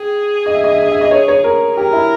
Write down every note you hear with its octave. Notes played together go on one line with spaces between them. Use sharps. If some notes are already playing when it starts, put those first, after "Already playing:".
Already playing: G#4 G5
D#5
E5
D#5
E5
D#5
E5
D#5
C#5
C#5
A#4
G4 A#4
E4